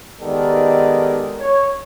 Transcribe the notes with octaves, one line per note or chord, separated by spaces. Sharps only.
D#3 G#3 B3 G4 A4 D5
C#5